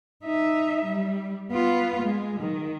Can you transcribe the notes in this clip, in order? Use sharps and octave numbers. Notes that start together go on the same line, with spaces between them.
D#4 E5
G3
B3 F4
G#3
D#3